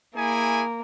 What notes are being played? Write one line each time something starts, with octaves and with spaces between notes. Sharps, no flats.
A#3 E4 G#4 G#5